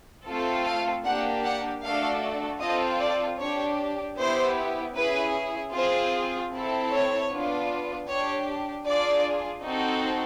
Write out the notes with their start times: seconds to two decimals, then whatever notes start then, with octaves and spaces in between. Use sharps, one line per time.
0.27 A3 C4 F4 A4
0.66 F5
1.04 A#3 D4 G4 F#5
1.44 F#5
1.82 A3 D4 F#4 A4 F5
2.61 C4 F4 A4 D#5
3.00 D5
3.39 D4 G4 C#5
4.17 B3 E4 G4 C5
4.95 C#4 E4 G#4 B4
5.73 C4 F4 G#4 C5
6.51 C4 E4 A4
6.90 C#5
7.30 B3 D4 F4
8.07 D4 G4 C#5
8.86 D4 F4 G#4 D5
9.64 C4 D#4 F#4 A4